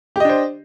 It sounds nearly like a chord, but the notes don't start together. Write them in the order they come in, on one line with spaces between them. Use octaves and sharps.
G4 D#5 D4 C5